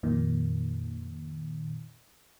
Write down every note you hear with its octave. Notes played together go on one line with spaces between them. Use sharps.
F2 A#2 D#3